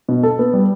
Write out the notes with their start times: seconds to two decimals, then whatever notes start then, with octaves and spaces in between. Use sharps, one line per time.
0.09 B2
0.23 A4
0.39 B3
0.53 G3